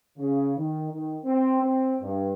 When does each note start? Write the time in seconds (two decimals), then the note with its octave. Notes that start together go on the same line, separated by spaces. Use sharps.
0.17 C#3
0.57 D#3
0.91 D#3
1.24 C4
1.61 C4
2.00 G2